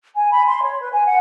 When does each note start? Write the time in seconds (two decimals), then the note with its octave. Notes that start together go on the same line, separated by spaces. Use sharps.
0.16 G#5
0.31 B5
0.47 C6
0.64 C#5
0.81 B4
0.93 G#5
1.07 F#5